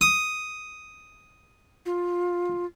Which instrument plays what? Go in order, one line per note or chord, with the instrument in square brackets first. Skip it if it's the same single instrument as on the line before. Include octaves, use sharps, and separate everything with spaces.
[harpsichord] D#6
[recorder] F4